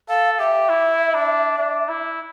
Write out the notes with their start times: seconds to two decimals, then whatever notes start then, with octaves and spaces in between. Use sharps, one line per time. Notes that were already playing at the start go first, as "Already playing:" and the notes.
0.09 A4 F5
0.39 G4 E5
0.69 E4
1.14 D4
1.59 D4
1.89 E4